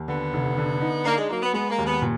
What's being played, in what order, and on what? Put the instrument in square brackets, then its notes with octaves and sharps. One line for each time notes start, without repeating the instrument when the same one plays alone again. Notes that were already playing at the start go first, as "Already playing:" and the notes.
Already playing: [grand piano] D#2
[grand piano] D3 [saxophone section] B3
[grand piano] F1
D3
D#4
[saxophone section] A#3 [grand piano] D4
[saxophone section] G#3
[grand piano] F#3 [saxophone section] A#3
[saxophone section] B3
[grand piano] G#3 [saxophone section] B3
[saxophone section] A#3
[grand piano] D#2
[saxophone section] B3
[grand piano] A#2